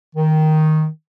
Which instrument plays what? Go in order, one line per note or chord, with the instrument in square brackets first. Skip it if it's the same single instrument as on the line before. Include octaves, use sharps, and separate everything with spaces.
[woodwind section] D#3